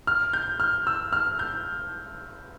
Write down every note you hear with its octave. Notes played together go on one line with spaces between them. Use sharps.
F6
G6
F6
E6
F6
G6